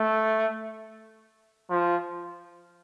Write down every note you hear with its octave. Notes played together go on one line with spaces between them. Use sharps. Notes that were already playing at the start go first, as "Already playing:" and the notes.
Already playing: A3
F3